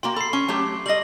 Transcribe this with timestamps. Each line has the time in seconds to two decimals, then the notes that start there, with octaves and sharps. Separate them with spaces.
0.03 A#3 F#4 G5 C6
0.16 A4 B5 C7
0.33 C#4 C#6
0.48 F#3 A3 G4
0.86 G3 D#5 A#6 F#7